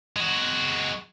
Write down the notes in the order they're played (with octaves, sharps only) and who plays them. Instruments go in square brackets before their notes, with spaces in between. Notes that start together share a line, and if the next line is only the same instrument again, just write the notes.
[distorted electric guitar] G#3 F#4